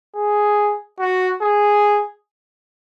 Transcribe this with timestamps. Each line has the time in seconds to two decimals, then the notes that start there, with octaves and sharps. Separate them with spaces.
0.15 G#4
1.00 F#4
1.42 G#4